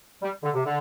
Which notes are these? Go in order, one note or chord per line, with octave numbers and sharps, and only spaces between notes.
G3
D3
C3
D3